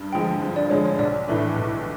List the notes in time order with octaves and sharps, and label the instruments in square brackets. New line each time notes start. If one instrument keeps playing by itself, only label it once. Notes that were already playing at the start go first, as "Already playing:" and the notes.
Already playing: [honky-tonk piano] G2
[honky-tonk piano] D3 F3 G#3 [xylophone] G5
[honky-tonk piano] G2
[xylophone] D5
[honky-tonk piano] D3 F3 G#3 [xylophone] C#5
[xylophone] C#5
[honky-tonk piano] B1 [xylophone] D5
[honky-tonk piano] A2 E3 A3 D4
B1